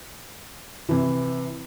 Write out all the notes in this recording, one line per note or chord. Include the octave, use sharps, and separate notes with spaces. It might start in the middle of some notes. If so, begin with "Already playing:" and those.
C3 E3